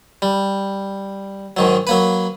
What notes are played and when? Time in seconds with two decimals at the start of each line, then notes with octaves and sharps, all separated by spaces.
0.22 G3
1.57 G#2 D#3 F#3
1.87 F#3 A#3 B4